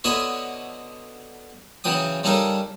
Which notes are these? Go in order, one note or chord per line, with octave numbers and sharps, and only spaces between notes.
D3 B3 F#4 C#5 D#5 E5
C#3 E3 F#3 G5 D#6
C#3 G3 D4 D#4 A4 A#4